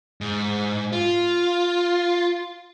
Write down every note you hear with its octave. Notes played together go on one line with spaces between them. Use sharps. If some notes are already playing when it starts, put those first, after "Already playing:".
G#2
F4